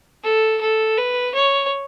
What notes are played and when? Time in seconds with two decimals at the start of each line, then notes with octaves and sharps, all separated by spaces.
0.24 A4
0.61 A4
0.97 B4
1.34 C#5